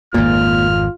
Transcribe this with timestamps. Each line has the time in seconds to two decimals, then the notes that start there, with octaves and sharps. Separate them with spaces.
0.14 G#1 F2 A#2 F4 F6